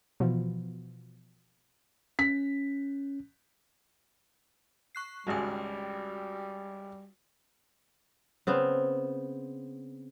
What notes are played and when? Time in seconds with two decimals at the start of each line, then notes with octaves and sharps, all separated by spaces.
0.20 B2 E3 F3
2.19 C#4 B6
4.95 C#6 F#6 C7
5.27 G#1 C#2 G3 G#3 F#4 G5
8.47 C#3 B3 C4